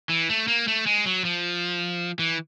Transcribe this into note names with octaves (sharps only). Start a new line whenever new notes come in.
E3
A3
A#3
A3
G#3
F#3
F3
E3